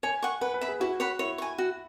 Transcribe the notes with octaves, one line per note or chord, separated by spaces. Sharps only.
C#5 G#5
F#5 C#6
B4 F#5
B4
E5 B5
G#4
E4 F#4
C#5 F#5 B5
E4 C#5
G#5 C#6
F#4